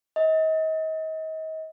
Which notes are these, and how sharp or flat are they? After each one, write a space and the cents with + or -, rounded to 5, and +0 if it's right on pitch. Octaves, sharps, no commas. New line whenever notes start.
D#5 +35